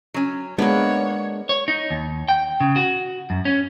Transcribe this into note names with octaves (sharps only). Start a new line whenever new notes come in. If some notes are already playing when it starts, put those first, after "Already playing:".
F#3 C#4
G#3 A#3 B3 D4 C#5
C#5
D#4
D#2
G5
C#3
F#4
F#2
C#4